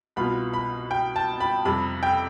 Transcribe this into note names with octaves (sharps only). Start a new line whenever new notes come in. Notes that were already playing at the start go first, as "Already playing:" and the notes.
C2 B2 B3 F4 B5
B5
G5
A5
B5
F2 C3 G3 B5
G5